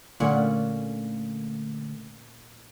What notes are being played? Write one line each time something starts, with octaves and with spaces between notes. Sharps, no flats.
A#2 D3 A3 C#4 F#5